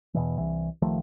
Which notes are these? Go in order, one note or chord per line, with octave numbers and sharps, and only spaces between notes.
E2 B2 E3
C2 E3
C2 D#3 F3 A3